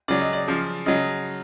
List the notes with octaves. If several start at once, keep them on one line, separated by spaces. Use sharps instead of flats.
C#3 F#3 D5
D#5
D5
C#3 F3
C#3 F#3 D#5